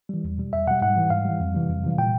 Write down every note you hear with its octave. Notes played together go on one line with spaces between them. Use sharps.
E3 G3
E2
B2 G3
E2 E5
B2 G3 F#5
G#2 F#5
E3 G3
G#2 F5
E3 G3
F2
C3 E3 G3
F2
C3 E3 G3
A#2 G5